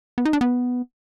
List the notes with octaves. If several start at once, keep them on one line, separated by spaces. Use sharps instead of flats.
B3
D#4
D4
B3